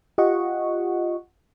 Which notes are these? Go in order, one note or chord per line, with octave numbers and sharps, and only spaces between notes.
F4 G4 D#5 F#5 C#6